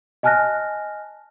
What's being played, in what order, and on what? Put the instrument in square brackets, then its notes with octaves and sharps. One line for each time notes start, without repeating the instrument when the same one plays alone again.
[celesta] D#5 G#5 A5 F6 F#6 A#6